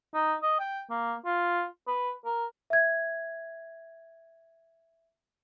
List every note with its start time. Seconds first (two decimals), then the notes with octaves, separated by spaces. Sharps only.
0.14 D#4
0.43 D#5
0.59 G5
0.90 A#3
1.25 F4
1.88 B4
2.25 A#4
2.70 E5 G#6